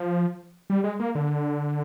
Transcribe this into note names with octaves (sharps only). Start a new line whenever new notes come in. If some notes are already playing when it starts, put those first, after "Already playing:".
Already playing: F3
G3
G#3
A#3
D3